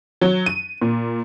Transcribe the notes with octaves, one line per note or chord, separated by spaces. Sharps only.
F#3
D#7
A#2